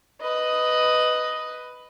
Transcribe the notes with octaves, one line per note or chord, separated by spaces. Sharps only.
B4 D#5